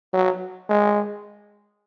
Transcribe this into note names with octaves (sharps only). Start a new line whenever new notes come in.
F#3
G#3